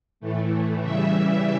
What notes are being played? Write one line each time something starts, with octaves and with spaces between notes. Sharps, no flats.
A2 E3 A3
C#3 E3 G3 E5